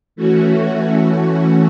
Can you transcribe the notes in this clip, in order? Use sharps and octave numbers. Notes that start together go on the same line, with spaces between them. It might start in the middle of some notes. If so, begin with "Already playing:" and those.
E3 A3 C#4 F#4